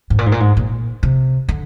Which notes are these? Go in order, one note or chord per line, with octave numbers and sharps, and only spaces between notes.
G#2
A#2
G#2
A#2
G#2
A#2
C3
D3